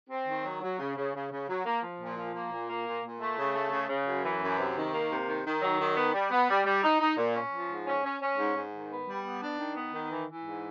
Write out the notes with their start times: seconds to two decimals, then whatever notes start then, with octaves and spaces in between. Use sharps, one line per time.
0.10 C4
0.27 D#3
0.44 F#3
0.61 F#3
0.79 C#3
0.96 C#3
1.14 C#3
1.30 C#3
1.48 F#3
1.65 A#3
1.82 F3
1.99 A#2
2.17 F3
2.34 A#3
2.51 A#2
2.69 A#3
2.86 A#2
3.03 A#2
3.20 A3
3.37 C#3
3.55 A3
3.72 C#3
3.89 C#3
4.06 F#2
4.24 E3
4.42 F#2
4.58 C3
4.76 D#3
4.93 A#3
5.10 C3
5.27 D#3
5.45 D#3
5.61 F#3
5.79 D#3
5.96 B3
6.14 G3
6.30 B3
6.49 G3
6.65 G3
6.82 D#4
7.00 D#4
7.17 A#2
7.35 C#4
7.52 F3
7.69 G#2
7.86 C#4
8.04 C#4
8.21 C#4
8.38 G#2
8.55 G#2
8.73 D#3
8.90 B3
9.07 G3
9.25 B3
9.41 D4
9.58 D#3
9.76 B3
9.93 D#3
10.10 E3
10.27 E3
10.44 G#2